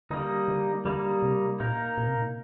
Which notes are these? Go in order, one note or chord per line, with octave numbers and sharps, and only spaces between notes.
D3 G3 A#3 D#4
D3
D3 G3 A#3 D#4
C3
A#2 A#3 D#4 A#4
A#2
C3
A#2